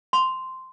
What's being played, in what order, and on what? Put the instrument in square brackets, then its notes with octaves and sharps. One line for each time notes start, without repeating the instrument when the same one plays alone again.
[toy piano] C6